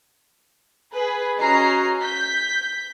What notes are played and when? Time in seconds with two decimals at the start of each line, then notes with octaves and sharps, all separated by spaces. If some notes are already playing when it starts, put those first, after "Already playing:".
0.93 G#4 B4
1.39 C#4 F#4 D#5 A#5 C7
2.02 G6 B6